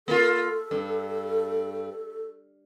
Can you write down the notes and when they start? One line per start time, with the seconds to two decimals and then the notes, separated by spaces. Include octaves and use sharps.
0.08 A#3 F4 A4
0.71 G2